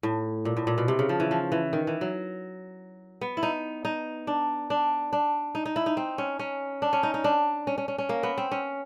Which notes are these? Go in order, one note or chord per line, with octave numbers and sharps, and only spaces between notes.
A2
A#2
A2
A#2
B2
C3
C#3
F3
E3
F3
E3
D#3
E3
F#3
B3
E4
D#4
D#4
D4
D4
D4
D#4
D#4
E4
D#4
C4
C#4
C#4
D4
C#4
D#4
D#4
D4
C#4
C#4
C#4
C#4
A#3
B3
C4
C#4